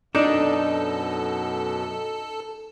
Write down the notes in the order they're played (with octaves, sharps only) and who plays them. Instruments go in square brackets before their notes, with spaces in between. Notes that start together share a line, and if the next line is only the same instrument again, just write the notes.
[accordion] F#2 B2 [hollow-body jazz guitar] D4 [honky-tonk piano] D#4 [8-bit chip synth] A4